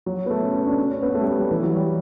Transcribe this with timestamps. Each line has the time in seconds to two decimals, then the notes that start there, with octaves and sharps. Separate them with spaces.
0.06 F#3
0.26 B3
0.30 A3
0.43 C#4
0.55 C#4
0.67 D4
0.79 C#4
0.90 C#4
1.02 B3
1.15 A3
1.21 G3
1.27 A3
1.39 G3
1.51 E3
1.63 F#3
1.75 G3